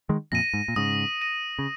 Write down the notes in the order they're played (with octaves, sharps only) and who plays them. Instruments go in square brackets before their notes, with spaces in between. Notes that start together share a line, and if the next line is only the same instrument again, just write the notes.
[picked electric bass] D#3 G#3
[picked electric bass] F2 A#2 [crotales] A#6 D#7
[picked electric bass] G#2
A#2
[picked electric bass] G#2 C#3 [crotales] D#6
[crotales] A#6 D#7
[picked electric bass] C#3